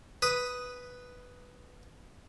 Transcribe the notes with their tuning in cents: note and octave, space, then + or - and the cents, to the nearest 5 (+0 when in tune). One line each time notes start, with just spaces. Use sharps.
B4 +0 D#6 +0